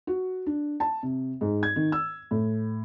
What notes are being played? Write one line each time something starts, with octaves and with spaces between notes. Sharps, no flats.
F#4
D4
A5
C3
G#2
G#6
D#3
E6
A2